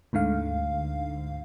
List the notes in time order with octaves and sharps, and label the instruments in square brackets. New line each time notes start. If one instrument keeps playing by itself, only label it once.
[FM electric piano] D2 G#2 D3 F5